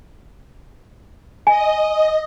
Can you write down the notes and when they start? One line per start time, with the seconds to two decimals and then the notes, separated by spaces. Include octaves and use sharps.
1.47 D#5 G#5